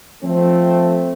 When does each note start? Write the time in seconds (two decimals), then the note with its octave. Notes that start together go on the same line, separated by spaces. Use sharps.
0.23 F3 A3 C4